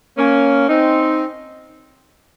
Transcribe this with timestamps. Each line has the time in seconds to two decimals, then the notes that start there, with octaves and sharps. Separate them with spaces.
0.18 A#3 C#4
0.69 C4 D#4